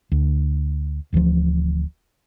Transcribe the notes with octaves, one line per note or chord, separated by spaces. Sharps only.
D2
D1 D2 E3 F3